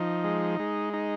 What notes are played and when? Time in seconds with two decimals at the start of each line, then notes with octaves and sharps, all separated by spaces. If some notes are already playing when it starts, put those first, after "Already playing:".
Already playing: F3 D#4
0.24 G#3
0.59 G#3
0.93 D#4